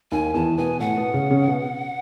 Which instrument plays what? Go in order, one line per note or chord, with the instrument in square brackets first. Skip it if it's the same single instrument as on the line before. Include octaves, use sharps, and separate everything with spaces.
[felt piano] D#2 D#3 [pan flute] G#5
[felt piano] E2 E3 [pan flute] A5
[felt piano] B2 B3 [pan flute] G#5
[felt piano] A2 A3 [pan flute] F#5
[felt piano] B2 B3
C#3 C#4
C#3 C#4
B2 B3